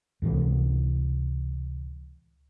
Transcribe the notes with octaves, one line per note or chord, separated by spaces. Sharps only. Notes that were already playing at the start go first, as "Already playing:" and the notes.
C#2 A2 C3 E3